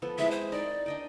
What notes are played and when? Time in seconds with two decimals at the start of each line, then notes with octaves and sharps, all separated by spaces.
0.02 F3 B3 A4
0.18 G#3 C4 E4 E5
0.31 C5
0.52 D#4 A#4 D5 G5
0.86 D4 D#5 G5